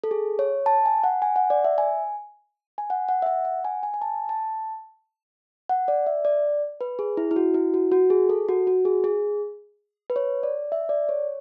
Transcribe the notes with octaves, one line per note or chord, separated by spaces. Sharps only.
A4
G#4
C#5
A5
G#5
F#5
G#5
F#5
D5
E5
G#5
G#5
F#5
F#5
E5
F#5
F#5
G#5
G#5
G#5
A5
A5
F#5
D5
E5
D5
B4
G#4
E4
E4
F#4
E4
F#4
F#4
G#4
A4
F#4
F#4
G#4
G#4
B4
C#5
D5
E5
D5
C#5